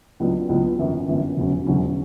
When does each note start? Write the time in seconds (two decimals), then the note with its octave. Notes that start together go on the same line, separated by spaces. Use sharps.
0.20 C#2 C#3 F#3 B3 D4
0.49 C#2 C#3 F#3 B3 D4
0.78 G1 F#2 E3 B3
1.08 G1 F#2 E3 B3
1.37 E1 D2 C#3 F#3 C#4
1.67 E1 D2 C#3 F#3 C#4